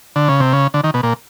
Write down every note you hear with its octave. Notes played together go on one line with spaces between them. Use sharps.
D3
C#3
C3
C#3
D3
D#3
B2
A#2